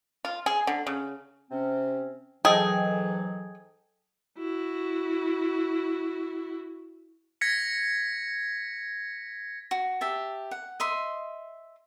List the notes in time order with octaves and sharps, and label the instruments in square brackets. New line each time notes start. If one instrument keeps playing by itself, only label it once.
[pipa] F4
G#4
D3
C#3
[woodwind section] C3 C4 C#4
[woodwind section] G#2 E3 F#3 [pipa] G#4 [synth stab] A4 D#5 G5
[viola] E4 F#4
[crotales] G#6 A#6 B6 C#7
[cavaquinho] F#4
G4 E5 A5
F#5
D#5 E5 C6